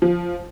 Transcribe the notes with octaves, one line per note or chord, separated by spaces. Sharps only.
F3